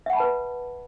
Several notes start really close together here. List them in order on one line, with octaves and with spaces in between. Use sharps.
E5 F#5 B5 A5 B4